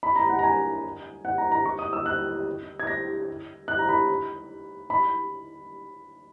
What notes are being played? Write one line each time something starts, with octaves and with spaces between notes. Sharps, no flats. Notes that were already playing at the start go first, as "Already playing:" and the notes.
B5
A#5
F#5
A#5
G#5
F#5
A#5
A#5
C#6
D#6
E6
F#6
G#6
A#6
F#6
A#5
B5
B5